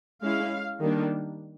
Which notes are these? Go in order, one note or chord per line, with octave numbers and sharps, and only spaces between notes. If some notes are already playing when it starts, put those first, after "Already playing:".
G#3 C#4 E4 F5
D#3 G3 A#3 D4